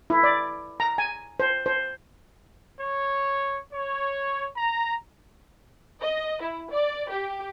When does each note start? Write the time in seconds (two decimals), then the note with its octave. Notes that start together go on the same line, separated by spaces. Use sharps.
0.10 E4
0.23 D5
0.80 A#5
0.98 G#5
1.40 C5
1.66 C5
2.81 C#5
3.72 C#5
4.56 A#5
6.02 D#5
6.42 E4
6.71 D5
7.10 G4